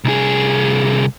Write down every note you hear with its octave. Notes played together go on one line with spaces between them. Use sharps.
C2 G#4